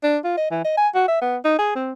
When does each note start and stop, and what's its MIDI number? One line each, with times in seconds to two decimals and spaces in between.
0.03 0.18 62
0.24 0.35 65
0.37 0.49 75
0.51 0.63 52
0.64 0.74 75
0.77 0.88 80
0.95 1.03 66
1.08 1.21 76
1.21 1.37 59
1.45 1.58 63
1.59 1.72 68
1.75 1.92 60